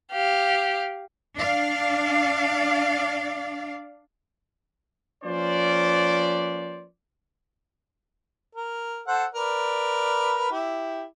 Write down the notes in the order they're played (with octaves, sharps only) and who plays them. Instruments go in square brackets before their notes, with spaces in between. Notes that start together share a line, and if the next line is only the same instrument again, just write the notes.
[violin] G4 F5
[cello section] D4 D5 F5
[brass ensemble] F3 A#3 C#4 B4 C5 D5
[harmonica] A#4
A4 C5 F#5
A#4 B4 D5
E4 G4